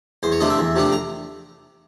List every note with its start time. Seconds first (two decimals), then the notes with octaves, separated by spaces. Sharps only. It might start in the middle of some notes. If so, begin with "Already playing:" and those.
0.23 E2 C5
0.32 C#5
0.40 C3 F3 A3 D4 D#5
0.50 E5
0.58 E2
0.76 C3 F3 A3 D4
0.92 A#5